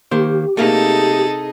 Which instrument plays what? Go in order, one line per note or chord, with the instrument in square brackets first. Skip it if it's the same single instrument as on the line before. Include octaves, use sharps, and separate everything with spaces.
[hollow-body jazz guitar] D#3 A#3 C5 [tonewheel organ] G4
[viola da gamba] C3 D#4 G#4 [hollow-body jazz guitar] A3 A#3 [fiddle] A4